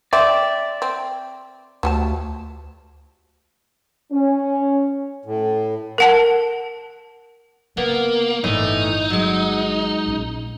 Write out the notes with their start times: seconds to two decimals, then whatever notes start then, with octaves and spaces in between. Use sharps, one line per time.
0.13 C4 D5 E5
0.82 C4
1.83 D2 F3 G3 A5
4.13 C#4
5.25 A2
5.98 A#4 F#5 A5
7.77 C#3 A#3 B3
8.44 G1 A2 E3 D#4 F4 C#5
9.10 F#3 G#3
10.06 A#1 C#4